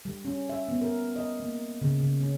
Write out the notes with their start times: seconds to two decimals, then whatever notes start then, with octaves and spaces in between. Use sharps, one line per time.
0.05 G3
0.25 C#4
0.49 E5
0.69 B3
0.81 A#4
1.16 D#5
1.40 A#3
1.82 C#3
2.00 C#3
2.21 C#4